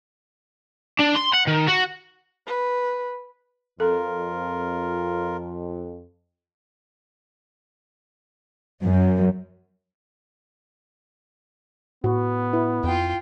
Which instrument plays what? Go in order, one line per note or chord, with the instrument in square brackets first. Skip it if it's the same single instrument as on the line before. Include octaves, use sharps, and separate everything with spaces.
[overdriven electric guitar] D4
C6
F#5
D#3
F#4
[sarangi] B4
[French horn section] F2 [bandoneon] F4 A#4 [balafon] A4
[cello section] F#2
[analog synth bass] A2 [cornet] B3 [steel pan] F#4
[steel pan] E4 B4
[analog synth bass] F2 [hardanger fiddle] F4 G5